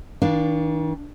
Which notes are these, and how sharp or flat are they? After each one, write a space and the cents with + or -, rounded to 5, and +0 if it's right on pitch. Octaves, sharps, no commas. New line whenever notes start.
D#3 +45 D4 +0 F5 +5